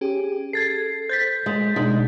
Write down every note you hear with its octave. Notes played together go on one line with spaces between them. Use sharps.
C#4 G4 G#4
A4 G#6 A6 C7
C5 G6 A6 B6
G#3
B2 G#3 D4 D#4